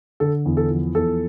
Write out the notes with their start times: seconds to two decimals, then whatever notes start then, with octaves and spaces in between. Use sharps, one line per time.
0.20 D3 A4
0.46 E2
0.57 A4
0.70 F3
0.95 E2 A4